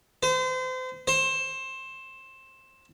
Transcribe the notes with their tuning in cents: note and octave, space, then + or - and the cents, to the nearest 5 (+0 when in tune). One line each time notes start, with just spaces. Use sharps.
C5 -35
C5 +20